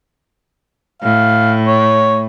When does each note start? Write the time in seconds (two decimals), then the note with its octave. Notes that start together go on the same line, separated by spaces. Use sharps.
1.03 A2 F5
1.67 C#5